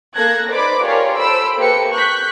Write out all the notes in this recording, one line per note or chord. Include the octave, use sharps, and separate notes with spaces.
A#3 A4 F#6 G#6 A#6
D#4 B4 C5 D5 B5 D6
F4 G4 G#4 A#4 C#5 D5
A4 C5 B5 E6 D7
A#3 G4 A4 B4 G5 C#7
C#6 F#6 G6 B6